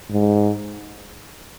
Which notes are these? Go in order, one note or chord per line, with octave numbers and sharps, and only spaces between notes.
G#2